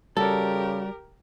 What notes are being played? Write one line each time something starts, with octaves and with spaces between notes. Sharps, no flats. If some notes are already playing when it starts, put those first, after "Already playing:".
C#3 G3 F#4 G4 A4 A#4 D5